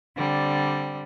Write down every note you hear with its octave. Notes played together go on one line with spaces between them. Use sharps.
D3 G3 C4